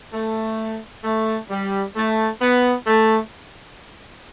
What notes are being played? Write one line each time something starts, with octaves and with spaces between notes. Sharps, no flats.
A3
A3
G3
A3
B3
A3